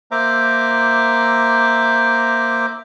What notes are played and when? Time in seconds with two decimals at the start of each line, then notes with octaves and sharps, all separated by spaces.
0.11 A#3 C5 E5 A#5 D6